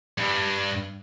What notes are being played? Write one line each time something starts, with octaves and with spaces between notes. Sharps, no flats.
G2